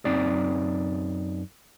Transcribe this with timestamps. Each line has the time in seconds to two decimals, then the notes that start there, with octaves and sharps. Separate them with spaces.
0.05 F#2 C4 D#4 D5